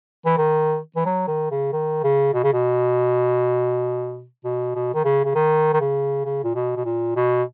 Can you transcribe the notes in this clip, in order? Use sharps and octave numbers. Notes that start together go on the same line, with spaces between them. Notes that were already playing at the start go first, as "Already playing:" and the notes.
E3
D#3
E3
F#3
D#3
C#3
D#3
C#3
B2
C#3
B2
B2
B2
D#3
C#3
C#3
D#3
D#3
C#3
C#3
A#2
B2
B2
A#2
B2